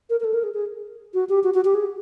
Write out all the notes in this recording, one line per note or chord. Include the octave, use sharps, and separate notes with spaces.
A#4
A#4
A4
A#4
G#4
G#4
F#4
G4
F#4
F#4
G4
G#4